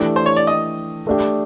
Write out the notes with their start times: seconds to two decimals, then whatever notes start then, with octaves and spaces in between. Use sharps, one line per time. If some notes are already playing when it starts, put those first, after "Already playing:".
Already playing: E3 A3 D4 G4
0.16 C5
0.26 C#5
0.37 D5
0.47 D#5
1.07 A3 D4 G4